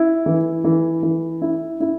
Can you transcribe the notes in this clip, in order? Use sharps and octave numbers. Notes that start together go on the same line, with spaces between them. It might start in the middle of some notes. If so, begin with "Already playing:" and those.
Already playing: E4
E3
E3
E3
E4
E4